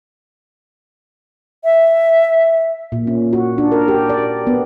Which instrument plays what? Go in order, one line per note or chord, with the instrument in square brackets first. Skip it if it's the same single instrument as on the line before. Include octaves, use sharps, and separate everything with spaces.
[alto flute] E5
[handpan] A#2
C#4
F#4
D4
A#4
G4
D5
B3